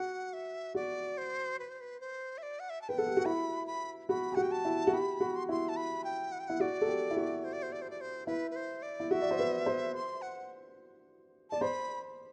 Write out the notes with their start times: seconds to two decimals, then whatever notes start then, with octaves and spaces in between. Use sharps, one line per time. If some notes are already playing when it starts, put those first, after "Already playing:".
Already playing: F#4 F#5
0.33 E5
0.75 F#4 D5
1.18 C5
1.59 B4
1.69 C5
1.81 B4
2.00 C5
2.38 E5
2.43 D5
2.60 F#5
2.70 E5
2.82 A5
2.89 B4 G5
2.98 A4 F#5
3.07 G4
3.17 F#4
3.25 E4 B5
3.67 B5
4.09 F#4 B5
4.32 G4
4.35 F#4 F#5
4.43 G5
4.52 A5
4.65 E4
4.87 F#4
4.93 G4 B5
5.20 F#4
5.35 C6
5.49 E4 C6
5.69 A5
5.76 B5
6.04 G5
6.32 F#5
6.39 G5
6.48 E4 F#5
6.60 F#4 D5
6.81 A4
6.87 G4
7.11 E4
7.16 F#4
7.44 C5
7.53 D5
7.63 C5
7.72 D5
7.82 C5
7.90 D5
8.01 C5
8.27 E4 B4
8.51 B4
8.56 C5
8.83 D5
9.00 E4
9.11 F#4 E5
9.21 D5
9.31 C5
9.39 B4
9.66 C5
9.95 C6
10.22 F#5
11.50 D5 A5
11.61 C5 B5